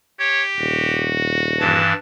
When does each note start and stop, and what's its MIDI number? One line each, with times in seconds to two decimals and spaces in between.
0.20 1.11 67
0.20 0.43 73
0.58 1.82 27
0.58 1.94 66
1.60 1.93 43
1.60 1.93 52
1.60 1.96 81